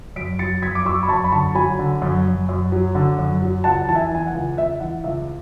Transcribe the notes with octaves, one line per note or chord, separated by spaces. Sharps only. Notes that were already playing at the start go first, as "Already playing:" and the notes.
F#2 B6 D7
F#3 A6 C#7
F#2 G#6 B6
D6
F#3 C#6 E6
B5
F#2 A5 C#6
B5
D3 A5 C#6
F#3 G#5 B5
D3
F#2
F#2
F#2
F#3
D3
F#2
F#3
C#2 F#5 A5
E3 A5
E5 G#5
E3 G#5
F#5
C#2
C#2 E5
E3 F#5
C#2 E5